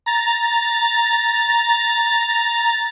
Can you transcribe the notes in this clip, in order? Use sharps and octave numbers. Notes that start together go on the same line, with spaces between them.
A#5 A6